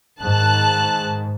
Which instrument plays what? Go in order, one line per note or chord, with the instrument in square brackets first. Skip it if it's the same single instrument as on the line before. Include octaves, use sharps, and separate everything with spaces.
[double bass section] G#2 [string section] D#3 A5 F#6